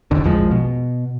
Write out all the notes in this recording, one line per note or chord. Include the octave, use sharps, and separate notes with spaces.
F1 D#2 D3
E1 A#1 F3 G#3
B2